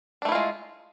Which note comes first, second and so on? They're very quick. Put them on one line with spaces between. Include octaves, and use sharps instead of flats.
D4 A3 E4 F4 G#3